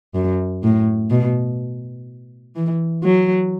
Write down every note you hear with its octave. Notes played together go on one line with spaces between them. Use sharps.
F#2
A2
B2
E3
F#3